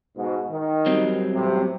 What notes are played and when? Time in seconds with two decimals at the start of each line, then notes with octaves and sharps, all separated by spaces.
0.17 G#2 B2
0.50 D#3
0.86 F#3 G3 C4
1.33 A1 A2 C3